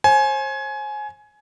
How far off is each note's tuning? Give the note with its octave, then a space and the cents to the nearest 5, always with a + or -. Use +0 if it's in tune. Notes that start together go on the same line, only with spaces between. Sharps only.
C5 +40 G#5 +20